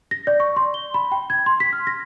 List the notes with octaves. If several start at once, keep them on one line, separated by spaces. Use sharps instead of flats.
A#6
D5
C#6
C6
G7
B5
G5
G#6
C6
B6
F6
A#6